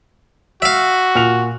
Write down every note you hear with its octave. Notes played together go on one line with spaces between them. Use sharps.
F#4 E5 F5
A#2 F6 F7